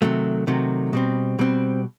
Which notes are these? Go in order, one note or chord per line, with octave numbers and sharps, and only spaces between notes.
C3 D#3 F#3 A3
C3 D#3 F#3 A3
B2 G3 C4
B2 G3 C4